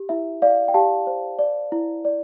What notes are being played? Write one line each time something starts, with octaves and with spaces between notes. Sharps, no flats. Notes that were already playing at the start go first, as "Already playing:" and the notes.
Already playing: G4
E4 E5
D5 F5
G5
G4 F5 A5
C5
D5
E4
D5